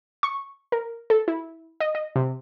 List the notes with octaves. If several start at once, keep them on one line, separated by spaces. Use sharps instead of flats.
C#6
A#4
A4
E4
D#5
D#5
C3